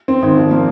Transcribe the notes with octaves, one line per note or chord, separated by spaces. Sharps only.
C4
G#1
F3
A#3